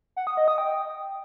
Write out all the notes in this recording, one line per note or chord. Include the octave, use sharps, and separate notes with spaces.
F#5
D#6
D#5
D#6
G5